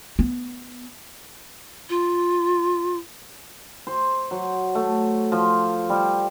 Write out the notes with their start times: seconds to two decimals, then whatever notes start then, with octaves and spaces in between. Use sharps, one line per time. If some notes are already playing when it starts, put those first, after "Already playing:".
0.19 B3
1.90 F4
3.87 C5
4.31 F#3
4.75 A3
5.32 F3
5.90 G3